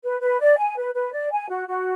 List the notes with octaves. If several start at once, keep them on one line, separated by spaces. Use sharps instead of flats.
B4
B4
D5
G#5
B4
B4
D5
G#5
F#4
F#4